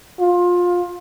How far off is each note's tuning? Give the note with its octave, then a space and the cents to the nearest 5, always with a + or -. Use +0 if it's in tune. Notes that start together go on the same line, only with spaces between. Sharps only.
F4 +20